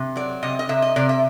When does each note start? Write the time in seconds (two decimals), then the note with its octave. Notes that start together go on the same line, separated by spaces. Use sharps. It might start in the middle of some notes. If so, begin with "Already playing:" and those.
Already playing: C3
0.16 F#3 D5
0.43 C3 D#5
0.59 D#5
0.69 C3 E5
0.82 D#5
0.96 C3 D5
1.09 E5